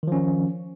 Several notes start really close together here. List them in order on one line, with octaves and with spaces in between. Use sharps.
D#3 F3 C#4